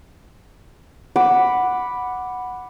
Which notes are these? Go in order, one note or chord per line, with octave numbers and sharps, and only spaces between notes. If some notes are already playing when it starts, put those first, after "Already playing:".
F#5 B5 D6